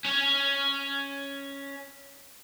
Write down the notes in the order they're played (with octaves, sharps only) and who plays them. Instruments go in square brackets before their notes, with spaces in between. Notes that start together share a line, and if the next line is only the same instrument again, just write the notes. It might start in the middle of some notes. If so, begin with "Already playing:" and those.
[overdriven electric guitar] C#4 C#5